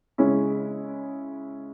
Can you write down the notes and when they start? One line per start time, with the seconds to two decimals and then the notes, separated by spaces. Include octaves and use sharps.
0.18 C#3 G#3 C#4 E4